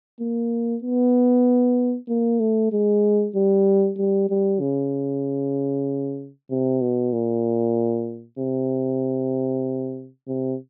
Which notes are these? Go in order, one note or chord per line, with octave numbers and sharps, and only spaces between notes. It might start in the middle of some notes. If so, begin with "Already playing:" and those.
A#3
B3
A#3
A3
G#3
G3
G3
G3
C#3
C3
B2
A#2
C3
C3